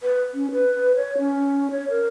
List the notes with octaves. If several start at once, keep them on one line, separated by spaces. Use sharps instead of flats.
B4
C#4
B4
C#5
C#4
C#5
A#4